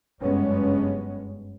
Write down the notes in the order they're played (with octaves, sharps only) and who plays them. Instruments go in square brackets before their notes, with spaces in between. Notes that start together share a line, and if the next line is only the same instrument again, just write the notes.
[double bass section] F#1 G2 G#3 B3 C#4